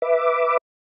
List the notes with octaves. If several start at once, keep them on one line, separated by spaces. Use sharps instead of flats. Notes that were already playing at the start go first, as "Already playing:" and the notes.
B4 E5 D6